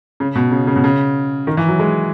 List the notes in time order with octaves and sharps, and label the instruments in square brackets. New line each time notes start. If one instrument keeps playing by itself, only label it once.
[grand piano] C#3
B2
C#3
C#3
B2
C#3
D#3
E3
F#3
G#3